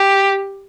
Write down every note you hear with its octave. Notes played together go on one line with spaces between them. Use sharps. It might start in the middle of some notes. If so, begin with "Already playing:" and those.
Already playing: G4